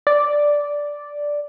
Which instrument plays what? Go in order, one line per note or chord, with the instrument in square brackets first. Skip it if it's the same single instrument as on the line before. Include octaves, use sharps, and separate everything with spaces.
[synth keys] D5